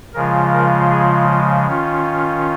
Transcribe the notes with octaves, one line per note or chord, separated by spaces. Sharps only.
C#3 F3 G#3 F4 A#4
A#4
G#4
F4
D#3 C#4 F4